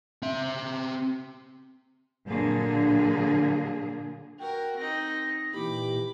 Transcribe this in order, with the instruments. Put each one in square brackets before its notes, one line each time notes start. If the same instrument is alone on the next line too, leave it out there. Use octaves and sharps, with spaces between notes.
[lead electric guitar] C4 E5
[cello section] A#2 D3 F#3 A#3 G#4
[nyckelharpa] F#4 A#4 [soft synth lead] G5
[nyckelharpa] C4 D#4 [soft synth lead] A#6
[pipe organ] A#2 E3 [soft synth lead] G4 [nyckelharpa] B5 D6